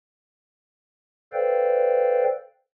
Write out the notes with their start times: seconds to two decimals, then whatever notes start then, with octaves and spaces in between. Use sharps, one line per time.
1.33 A4 B4 C5 D5 F5 G5